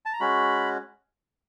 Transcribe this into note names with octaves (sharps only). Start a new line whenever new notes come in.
A5
A#5
G#3 C#4 F#4 B5